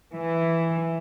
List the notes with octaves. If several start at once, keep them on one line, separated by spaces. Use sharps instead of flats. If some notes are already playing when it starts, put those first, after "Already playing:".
E3